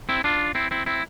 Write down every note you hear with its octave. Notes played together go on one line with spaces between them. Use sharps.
C4 E4
D4 F4
C4 E4
C4 E4
C4 E4